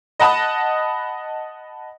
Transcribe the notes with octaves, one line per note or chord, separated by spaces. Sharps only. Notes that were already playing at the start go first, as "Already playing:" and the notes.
D#5 F#5 A5 B5 D#6